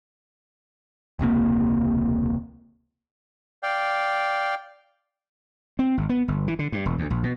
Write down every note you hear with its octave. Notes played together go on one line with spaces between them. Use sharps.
E1 C#2 C3 A#3
D5 F5 G5
C4
G#1
B3
G1
E3
D3
G2
E1
D2
A#1
B2